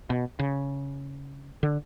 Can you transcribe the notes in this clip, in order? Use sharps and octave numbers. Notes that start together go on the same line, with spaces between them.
B2
C#3
D3